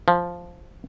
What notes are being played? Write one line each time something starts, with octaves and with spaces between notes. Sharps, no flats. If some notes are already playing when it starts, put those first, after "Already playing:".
F3